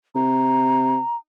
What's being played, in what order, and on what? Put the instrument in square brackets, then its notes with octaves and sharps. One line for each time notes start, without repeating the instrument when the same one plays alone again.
[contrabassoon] C3 [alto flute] A#5